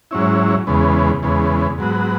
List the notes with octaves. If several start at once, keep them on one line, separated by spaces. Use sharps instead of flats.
G#2 F#3 C#4 E4
E2 C#3 G#3 B3
E2 C#3 G#3 B3
G#2 F#3 B3 F#4